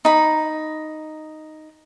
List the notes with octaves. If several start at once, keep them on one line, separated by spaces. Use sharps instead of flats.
D#4 B5